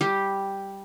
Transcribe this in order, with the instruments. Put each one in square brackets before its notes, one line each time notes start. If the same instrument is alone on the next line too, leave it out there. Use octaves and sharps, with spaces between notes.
[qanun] G3 G4